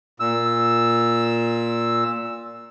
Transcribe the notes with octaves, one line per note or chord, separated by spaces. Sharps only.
A#2 E6